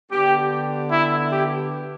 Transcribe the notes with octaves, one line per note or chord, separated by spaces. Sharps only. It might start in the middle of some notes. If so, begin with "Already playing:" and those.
D3 B3 D4 G4
E4
G4